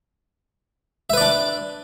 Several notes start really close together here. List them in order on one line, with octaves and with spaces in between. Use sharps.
E5 B4 D5 D4